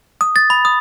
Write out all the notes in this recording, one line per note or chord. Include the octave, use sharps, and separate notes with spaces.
D#6
A6
B5
D#6